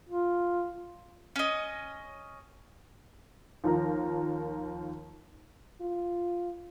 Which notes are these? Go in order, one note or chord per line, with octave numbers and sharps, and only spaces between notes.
F4
C#4 D#5
D#2 F3 A#4 A#5
F4